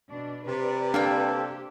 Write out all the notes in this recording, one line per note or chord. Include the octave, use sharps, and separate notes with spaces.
B2 D4
C3 B4 D5
A#3 D4 A4 G5
G4